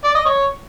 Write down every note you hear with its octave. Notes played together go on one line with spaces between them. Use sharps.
D5
D#5
C#5